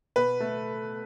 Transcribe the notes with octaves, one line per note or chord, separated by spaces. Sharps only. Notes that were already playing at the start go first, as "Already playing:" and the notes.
B2 B4
A3